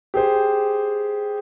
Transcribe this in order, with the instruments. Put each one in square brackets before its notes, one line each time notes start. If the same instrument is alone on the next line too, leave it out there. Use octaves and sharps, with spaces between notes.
[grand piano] G4 G#4 C5